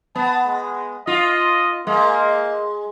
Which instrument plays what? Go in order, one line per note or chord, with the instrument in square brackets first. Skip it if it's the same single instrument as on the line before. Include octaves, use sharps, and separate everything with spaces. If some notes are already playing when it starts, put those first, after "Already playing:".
[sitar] B3 [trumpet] A5
[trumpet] G#3
[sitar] F4 [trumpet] D#5
[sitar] G#3 [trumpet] A#3